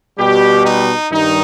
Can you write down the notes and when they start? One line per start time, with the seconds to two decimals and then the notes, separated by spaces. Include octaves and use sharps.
0.18 B2 G3 G4
0.65 D#4
1.10 G2 D#3 G3 D#4